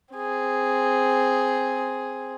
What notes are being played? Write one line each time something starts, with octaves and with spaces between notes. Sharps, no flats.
C4 G#4